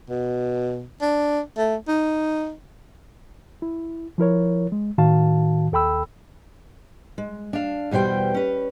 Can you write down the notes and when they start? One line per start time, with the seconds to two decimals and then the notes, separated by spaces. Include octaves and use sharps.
0.10 B2
1.01 D4
1.57 A3
1.88 D#4
3.62 E4
4.18 F3 E4 A#4 C#5
4.72 G#3
4.98 A2 D#3 F#4 F5 A5
5.72 D#2 A4 G5 B5 E6
7.18 G#3
7.53 D4 F5
7.91 E2 B2 G3 C5 G5
8.34 C#4 B4